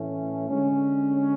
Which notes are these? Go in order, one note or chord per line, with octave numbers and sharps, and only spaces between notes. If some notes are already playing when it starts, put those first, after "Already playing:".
Already playing: A2 E3 A3 C#4
D3 G#3 C#4